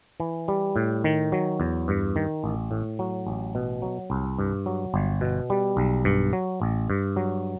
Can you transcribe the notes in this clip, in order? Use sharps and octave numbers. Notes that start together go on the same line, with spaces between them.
E3
G3
A2
D#3
F#3
E2
G2
D#3
A1
A2
F#3
A1
B2
F#3
C2
G2
F#3
G1
B2
G3
B1
G2
F#3
A1
G2
F#3